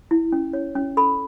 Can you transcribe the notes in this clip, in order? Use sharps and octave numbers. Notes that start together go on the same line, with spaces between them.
E4
C#4
C#5
C#4
A4 B5